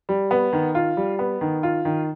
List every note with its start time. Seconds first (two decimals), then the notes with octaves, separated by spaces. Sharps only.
0.09 G3
0.31 B3
0.53 D#3
0.75 F4
0.97 G3
1.19 B3
1.41 D#3
1.63 F4
1.85 D#3